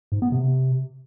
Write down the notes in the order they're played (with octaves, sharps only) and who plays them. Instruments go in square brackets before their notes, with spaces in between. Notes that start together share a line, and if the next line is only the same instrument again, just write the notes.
[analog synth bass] G#2
B3
C3